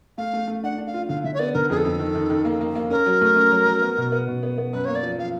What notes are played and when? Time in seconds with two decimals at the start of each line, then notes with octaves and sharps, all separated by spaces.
0.18 A3 F5
0.33 A3
0.48 A3
0.63 D4 F#5
0.78 D4
0.87 F5
0.94 F4
1.09 D3 F5
1.24 D3 E5
1.34 C#5
1.39 B3 D5
1.54 D3 A#4
1.70 F2 G#4
1.77 A4
1.85 F2
1.99 D#3
2.15 D#3
2.30 D#3
2.45 A#3
2.61 A#3
2.75 A#3
2.90 C#4 A#4
3.06 F#3
3.21 A3
3.36 C#4
3.51 F#3
3.66 F#3
3.82 B3
3.97 B2
4.12 B3
4.27 B2
4.43 B3
4.58 B3
4.73 F#2 B4
4.85 A#3 C#5
4.96 D5
5.03 F3
5.18 F3 F5